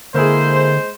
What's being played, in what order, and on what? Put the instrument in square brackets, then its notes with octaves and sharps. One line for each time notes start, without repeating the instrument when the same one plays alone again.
[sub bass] D3 [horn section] G#3 C5 [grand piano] A#3 E4 G#4